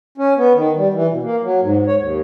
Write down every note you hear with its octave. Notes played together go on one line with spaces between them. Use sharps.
C#4
B3
D#3
G3
E3
B2
A#3
F#3
G#2
C#5
D#2